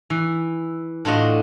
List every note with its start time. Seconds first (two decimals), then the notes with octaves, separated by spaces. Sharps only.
0.10 E3
1.05 A2 D4 F4 F#4 D#5